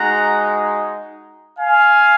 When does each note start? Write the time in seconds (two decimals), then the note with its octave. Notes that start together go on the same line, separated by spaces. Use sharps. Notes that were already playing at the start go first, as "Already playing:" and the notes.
Already playing: G#3 D#4 F#4 F#5 A#5
1.59 F5 G#5